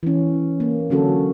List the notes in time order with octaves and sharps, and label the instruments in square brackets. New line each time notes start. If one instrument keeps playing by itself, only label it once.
[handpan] E3 C#4
A#3
D3 F#3 C#4 F#4 A4